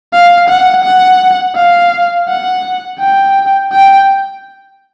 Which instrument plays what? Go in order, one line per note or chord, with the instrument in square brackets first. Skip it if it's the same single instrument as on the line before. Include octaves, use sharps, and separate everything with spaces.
[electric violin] F5
F#5
F#5
F5
F#5
G5
G5